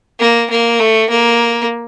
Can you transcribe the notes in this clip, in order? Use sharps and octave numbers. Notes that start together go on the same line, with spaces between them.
A#3
A#3
A3
A#3